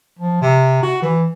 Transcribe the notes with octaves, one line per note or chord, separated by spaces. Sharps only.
F3
C3
F#4
E3